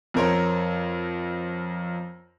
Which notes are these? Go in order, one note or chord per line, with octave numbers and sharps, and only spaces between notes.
F2 C4 A#4 C#5 C6